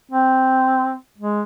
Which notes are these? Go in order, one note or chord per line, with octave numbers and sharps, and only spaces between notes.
C4
G#3